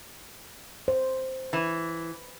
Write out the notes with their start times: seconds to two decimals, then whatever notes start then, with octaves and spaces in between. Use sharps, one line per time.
0.88 C5
1.53 E3